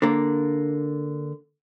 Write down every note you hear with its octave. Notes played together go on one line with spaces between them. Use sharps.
D3 A#3